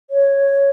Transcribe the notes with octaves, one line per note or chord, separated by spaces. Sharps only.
C#5